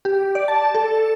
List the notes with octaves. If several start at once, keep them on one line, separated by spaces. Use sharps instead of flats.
G4
D5
A5
A4